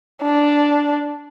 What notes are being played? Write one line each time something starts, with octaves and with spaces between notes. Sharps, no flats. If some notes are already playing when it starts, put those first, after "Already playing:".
D4